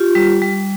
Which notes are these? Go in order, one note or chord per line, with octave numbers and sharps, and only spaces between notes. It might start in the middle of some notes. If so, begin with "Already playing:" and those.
Already playing: F4 G4
G3
G3